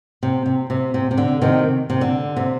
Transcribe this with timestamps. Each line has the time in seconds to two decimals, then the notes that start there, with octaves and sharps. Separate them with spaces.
0.23 C3
0.46 C3
0.70 C3
0.94 C3
1.11 C3
1.17 D3
1.42 C3 D#3
1.90 C3
2.01 D3
2.37 C3